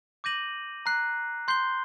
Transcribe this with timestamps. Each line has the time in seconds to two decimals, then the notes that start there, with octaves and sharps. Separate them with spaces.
0.24 D6 G6 A#6 D#7 F#7
0.86 A#5 F#6 C7
1.48 C6 G6 C7 G7